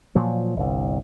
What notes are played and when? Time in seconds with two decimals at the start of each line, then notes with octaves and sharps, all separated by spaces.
0.15 A#2 F3 F#3
0.56 G1 C2